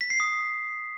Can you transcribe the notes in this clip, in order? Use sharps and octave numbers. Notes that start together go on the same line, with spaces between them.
B6
C7
D#6